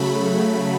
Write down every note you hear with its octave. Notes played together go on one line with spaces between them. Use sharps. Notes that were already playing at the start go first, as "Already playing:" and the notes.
Already playing: C#3 F#3 A3 B5